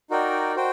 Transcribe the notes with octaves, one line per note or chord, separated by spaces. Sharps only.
D#4 F#4 A#4 D5 G5
F#4 C5 G5